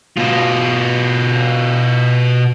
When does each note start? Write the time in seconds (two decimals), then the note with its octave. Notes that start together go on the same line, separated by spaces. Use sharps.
0.17 B2 F4